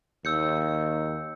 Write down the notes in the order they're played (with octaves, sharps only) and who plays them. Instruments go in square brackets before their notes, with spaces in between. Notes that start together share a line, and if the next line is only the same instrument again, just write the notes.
[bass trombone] D#2 [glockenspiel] E6 G6 C#7